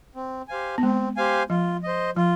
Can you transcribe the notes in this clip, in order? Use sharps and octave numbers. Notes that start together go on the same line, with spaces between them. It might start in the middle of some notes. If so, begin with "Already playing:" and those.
C4
G4 C5 F5 G#5
B3
G#3 C4
G4 C5 F5 G#5
F3 F4
C5 D#5
F3 F4